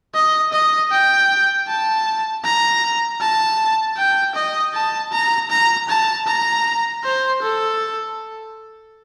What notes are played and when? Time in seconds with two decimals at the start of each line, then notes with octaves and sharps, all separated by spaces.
0.14 D#5
0.52 D#5
0.91 G5
1.67 A5
2.44 A#5
3.21 A5
3.97 G5
4.35 D#5
4.74 A5
5.12 A#5
5.50 A#5
5.89 A5
6.27 A#5
7.03 C5
7.42 A4